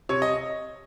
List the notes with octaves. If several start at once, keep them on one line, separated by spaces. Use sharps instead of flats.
C3 C#5
D#5